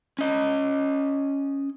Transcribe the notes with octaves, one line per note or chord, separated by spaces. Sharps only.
C#4 D#5